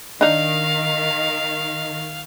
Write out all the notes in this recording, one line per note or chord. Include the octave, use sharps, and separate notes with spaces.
D#3 D4 D#4 F5